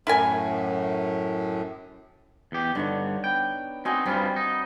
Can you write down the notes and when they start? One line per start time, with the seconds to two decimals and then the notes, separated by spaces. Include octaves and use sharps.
0.07 F#2 A2 E4 A#4 G#5
2.52 E2 G4
2.75 G2 D3 D4 D#4 C#5
3.24 B3 G5
3.85 C4 D#4 F#4 G#5
4.06 G2 G3 C4 F4 B5
4.36 D#4